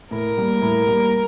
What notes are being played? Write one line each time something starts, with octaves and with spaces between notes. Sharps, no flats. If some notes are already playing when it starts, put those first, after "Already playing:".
A2 A#4
G3 A#3
A2
G3 A#3